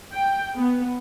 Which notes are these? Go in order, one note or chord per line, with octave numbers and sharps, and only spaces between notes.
G5
B3